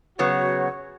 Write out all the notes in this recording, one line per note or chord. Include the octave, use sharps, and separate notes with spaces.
C#3 F#3 B3 F#4 C#5